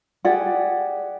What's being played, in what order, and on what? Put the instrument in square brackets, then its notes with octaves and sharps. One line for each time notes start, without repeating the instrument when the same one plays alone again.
[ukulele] G4 G#4 D5 F#5